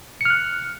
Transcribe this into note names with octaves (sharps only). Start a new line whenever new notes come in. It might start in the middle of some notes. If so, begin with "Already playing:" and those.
F6 F#6 C#7